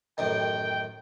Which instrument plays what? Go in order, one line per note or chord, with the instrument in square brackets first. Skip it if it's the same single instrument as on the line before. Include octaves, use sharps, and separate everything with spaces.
[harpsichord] A1 F#2 D#3 [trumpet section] G5